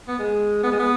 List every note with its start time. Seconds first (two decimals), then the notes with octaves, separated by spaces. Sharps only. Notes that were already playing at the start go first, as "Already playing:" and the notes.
0.08 B3
0.19 G#3
0.63 B3
0.72 G#3
0.79 B3